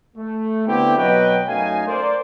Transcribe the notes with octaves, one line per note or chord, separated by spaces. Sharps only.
A3
D3 B3 C4 E4 G4
B2 F#3 F#4 B4 D#5 G5
F#2 A3 D#4 F5 G#5
A#4 C5 D5